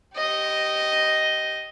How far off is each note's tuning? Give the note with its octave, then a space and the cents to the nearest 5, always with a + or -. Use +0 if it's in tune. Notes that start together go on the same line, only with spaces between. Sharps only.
G4 -15 D#5 +0